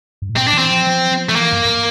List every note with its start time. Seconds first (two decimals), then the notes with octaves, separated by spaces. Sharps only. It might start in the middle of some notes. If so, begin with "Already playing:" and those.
0.22 G2
0.29 A2
0.36 A#2 C4
0.48 D4
0.53 E3
0.58 C4
0.70 F3
0.86 F3
1.11 F3
1.29 A3
1.36 E3 A#3
1.53 G2
1.65 G2